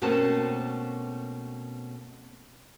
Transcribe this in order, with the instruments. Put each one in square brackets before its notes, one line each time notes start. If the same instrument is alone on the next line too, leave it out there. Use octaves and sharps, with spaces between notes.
[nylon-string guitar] B2 A3 A#3 C4 C#4 A5